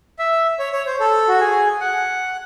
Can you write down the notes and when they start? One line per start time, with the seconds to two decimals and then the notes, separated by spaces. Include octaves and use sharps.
0.19 E5
0.59 C#5
0.73 C#5
0.86 C5
1.00 A4
1.28 F#4
1.40 G#4
1.80 F#5